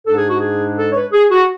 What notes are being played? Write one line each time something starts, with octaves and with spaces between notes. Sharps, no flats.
G#2 G#3 D4 A4
G#4
F#4
G#4
A4
C#5
B4
G#4
F#4